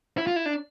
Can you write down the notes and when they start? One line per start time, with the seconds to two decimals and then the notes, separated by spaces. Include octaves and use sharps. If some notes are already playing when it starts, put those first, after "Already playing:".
0.18 E4
0.27 F4
0.36 E4
0.46 D4